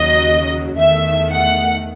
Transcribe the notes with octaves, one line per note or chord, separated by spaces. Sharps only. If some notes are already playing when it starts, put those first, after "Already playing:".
Already playing: D#2 C#3 F#3 D#5
E2 D#3 A3 E5
F#5